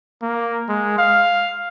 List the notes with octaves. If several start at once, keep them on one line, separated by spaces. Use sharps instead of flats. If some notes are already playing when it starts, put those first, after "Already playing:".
A#3
G#3
F5